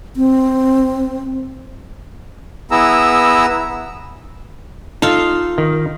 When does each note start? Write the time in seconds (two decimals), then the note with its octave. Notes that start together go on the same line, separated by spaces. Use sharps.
0.16 C4
2.71 B3 E4 G#4 A#5 E6
5.02 D#4 F4 A4 F5
5.58 D#3